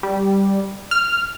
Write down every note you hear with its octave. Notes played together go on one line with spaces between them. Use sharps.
G3
F6